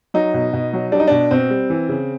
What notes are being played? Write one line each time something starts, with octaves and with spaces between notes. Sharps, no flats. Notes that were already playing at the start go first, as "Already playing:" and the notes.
F#3 D#4
B2
B2
F#3
G3 D4
D#4
B2 D4
B2 C4
G3
E3
C#3